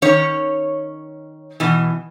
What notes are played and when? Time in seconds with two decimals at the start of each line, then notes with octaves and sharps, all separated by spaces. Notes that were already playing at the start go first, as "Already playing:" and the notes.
0.02 D#3 C#4 C#5
1.60 B2 E3